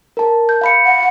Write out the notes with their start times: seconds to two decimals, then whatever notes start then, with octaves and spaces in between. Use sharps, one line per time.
0.17 A#4 A5
0.49 G6
0.61 F5 B5 C#7
0.86 F#5